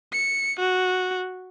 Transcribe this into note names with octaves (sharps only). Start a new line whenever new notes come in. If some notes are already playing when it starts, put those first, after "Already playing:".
C#7
F#4